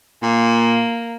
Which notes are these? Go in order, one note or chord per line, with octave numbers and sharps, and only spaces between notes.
A#2 A#3